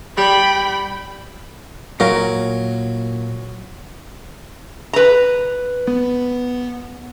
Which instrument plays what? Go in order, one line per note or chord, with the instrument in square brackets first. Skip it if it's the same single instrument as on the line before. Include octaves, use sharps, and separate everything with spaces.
[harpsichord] G3 [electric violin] G5 B5
[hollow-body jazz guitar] A#2 A#4 F5 [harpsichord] F#3
[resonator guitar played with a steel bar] B4 A#5
[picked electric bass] B3